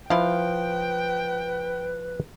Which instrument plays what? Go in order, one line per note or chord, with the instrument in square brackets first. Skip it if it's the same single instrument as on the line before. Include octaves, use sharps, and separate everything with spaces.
[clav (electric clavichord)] F3 [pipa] E4 F5 [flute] B4 [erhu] G5